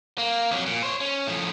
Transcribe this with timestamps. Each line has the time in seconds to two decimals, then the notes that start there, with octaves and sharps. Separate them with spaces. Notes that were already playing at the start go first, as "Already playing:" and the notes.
0.18 A#3
0.51 F2 F#3
0.66 A#2
0.83 C5 C#5
1.01 C#4
1.27 A2 F3